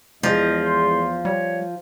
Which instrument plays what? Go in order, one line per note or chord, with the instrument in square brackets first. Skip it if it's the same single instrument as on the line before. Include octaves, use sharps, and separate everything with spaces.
[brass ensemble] E2 [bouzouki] F3 [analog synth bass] G#3 [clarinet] D#5
[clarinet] C6
[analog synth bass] G3 [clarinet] C#5